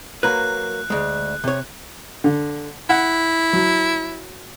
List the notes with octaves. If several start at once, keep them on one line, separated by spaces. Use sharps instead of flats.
F#3 A#3 B4 F#6
D2 G#3
C3 C#5
D3
E4 F#5
F#3